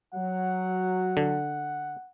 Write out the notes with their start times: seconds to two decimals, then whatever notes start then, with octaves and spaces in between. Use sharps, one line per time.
0.14 F#3 F#5
1.17 D3